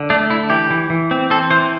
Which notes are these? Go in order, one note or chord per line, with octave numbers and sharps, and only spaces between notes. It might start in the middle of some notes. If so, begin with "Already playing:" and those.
Already playing: D3
A3 D4
D3 E4
E3 G4
E3
E3
C4
C4 A4
E3 C5